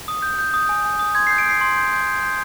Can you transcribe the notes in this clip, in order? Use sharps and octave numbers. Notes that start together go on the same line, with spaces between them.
D#6
G6
G6
D#6
G#5
G#5
D#6
C6 G#6
C7
G6
D7
G6 C7
C6
G6
G6
G6
G6